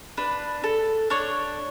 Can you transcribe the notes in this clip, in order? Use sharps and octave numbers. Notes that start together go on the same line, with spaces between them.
D4 B4
A4
D4 C#5